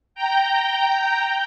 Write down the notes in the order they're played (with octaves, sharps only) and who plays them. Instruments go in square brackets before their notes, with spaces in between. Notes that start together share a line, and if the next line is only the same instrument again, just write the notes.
[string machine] G5 A#5 G6